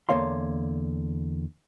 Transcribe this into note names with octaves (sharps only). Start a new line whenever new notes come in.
E2 D3 A#3 C#5 F5 C6